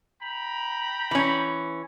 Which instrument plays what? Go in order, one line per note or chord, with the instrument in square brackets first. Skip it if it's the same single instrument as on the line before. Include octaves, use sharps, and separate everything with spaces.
[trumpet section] G5 A#5 B5
[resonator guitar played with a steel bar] E3 C#4